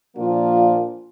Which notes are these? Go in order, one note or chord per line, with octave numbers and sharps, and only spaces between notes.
A#2 F3 A#3 D4 F4